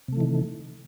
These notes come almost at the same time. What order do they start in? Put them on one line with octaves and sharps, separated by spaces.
C3 A3 E3 D#3